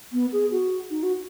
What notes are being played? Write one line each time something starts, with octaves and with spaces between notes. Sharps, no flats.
B3
G#4
F#4
D#4
F#4